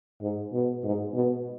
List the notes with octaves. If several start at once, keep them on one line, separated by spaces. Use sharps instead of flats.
G#2
B2
G#2
B2